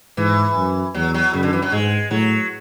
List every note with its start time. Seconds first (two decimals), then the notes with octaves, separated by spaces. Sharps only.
0.17 G#2 E3
0.56 F#2
0.94 E2 F#3
1.14 F#3
1.33 F#2 C#3
1.43 D3
1.53 E3
1.62 F#3
1.72 G#2 G#3
2.11 A2 F#3